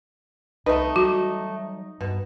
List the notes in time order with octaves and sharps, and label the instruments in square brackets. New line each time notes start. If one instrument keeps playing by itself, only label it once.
[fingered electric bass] C2 [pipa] A3 B4 [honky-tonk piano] D#4
[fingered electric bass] F#3 G3 [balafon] F#4
[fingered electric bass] G2 [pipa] B2